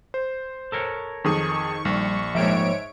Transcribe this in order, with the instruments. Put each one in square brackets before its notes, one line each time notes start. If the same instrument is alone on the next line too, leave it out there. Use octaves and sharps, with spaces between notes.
[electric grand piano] C5
[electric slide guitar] A4 A#4 C#5
[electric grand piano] F2 G#4 D#6 [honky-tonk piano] D#3 [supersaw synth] C#6
[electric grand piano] A#1 [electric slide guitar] G3
[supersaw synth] G#2 C#5 D7 [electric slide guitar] F3 G3 A#3 [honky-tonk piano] E5